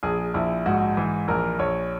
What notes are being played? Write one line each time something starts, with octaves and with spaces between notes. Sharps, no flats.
A#1 G#4
A#1 E4
G#2 F#4
E3
A#1 A#4
A#1 C#5